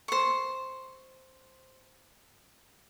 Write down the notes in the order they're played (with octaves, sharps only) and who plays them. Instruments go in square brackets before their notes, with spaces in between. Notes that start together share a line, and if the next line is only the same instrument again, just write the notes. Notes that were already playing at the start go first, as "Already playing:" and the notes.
[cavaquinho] C5 C#6